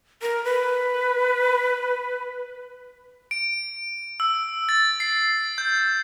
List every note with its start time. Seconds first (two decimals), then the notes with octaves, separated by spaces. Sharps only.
0.22 A#4
0.44 B4
3.31 D7
4.20 E6
4.69 A6
5.00 C7
5.58 G6